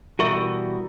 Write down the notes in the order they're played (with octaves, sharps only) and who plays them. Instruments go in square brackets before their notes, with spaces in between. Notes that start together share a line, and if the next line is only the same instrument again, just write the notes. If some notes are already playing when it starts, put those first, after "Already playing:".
[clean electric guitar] B2 E3 G3 [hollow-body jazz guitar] F#4 A#4 [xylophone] E5 C#6 D#7